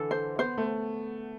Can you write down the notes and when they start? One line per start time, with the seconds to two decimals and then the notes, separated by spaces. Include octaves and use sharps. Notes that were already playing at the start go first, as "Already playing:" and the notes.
Already playing: D3 E3 A4
0.11 C5
0.38 B3 C5
0.58 A3